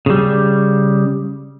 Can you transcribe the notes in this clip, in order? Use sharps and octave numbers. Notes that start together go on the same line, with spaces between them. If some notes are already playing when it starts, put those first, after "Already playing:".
C#3 G3